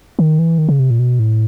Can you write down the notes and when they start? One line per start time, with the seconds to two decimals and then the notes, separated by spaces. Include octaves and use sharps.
0.19 D#3
0.39 E3
0.58 D#3
0.69 C#3
0.79 C3
0.91 A#2
0.99 B2
1.19 A2